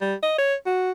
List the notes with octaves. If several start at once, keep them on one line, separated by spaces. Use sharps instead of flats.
G3
D#5
C#5
F#4